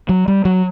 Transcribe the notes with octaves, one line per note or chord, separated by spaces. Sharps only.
F#3
G3
F#3